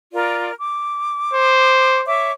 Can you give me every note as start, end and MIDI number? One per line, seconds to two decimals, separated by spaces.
0.13 0.52 65
0.13 0.52 70
0.13 0.52 74
0.58 2.01 86
1.34 2.07 72
2.06 2.31 73
2.06 2.31 76
2.06 2.31 86